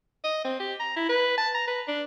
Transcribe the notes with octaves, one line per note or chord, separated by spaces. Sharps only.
D#5
C4
G4
A#5
E4
B4
A5
A#5
B4
D4